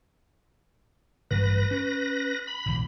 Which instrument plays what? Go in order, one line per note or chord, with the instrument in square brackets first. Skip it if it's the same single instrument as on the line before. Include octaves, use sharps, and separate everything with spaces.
[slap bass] A1 G2 [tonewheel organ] B4 A#6
[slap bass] C#4
[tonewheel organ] B5
[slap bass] B1 E2 A2